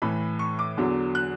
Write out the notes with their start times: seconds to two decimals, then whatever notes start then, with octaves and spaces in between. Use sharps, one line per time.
0.02 A2 E3 B5
0.39 C#6
0.59 D6
0.77 E2 D3 F#3
1.15 F#6